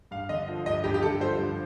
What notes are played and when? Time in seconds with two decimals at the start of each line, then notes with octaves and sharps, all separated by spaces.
0.11 G2 F5
0.29 D3 D#5
0.48 F3
0.66 G2 D#5
0.84 G2 G4
0.94 G4
1.02 D3 A4
1.20 F3 C5
1.39 G2